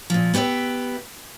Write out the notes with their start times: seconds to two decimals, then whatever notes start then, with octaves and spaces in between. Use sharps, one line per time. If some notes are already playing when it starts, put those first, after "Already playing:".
0.10 A#2 F3
0.34 B3 G4 B4 D5 E5